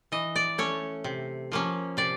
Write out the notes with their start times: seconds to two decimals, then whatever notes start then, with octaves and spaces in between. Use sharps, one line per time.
0.12 E3 D#5
0.36 D5
0.58 A3 C#4 C#5
1.04 C3
1.52 F3 A#3 C#4
1.97 C3 D5